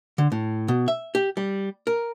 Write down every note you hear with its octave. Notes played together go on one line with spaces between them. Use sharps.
D3
A2
B2
E5
G4
G3
A#4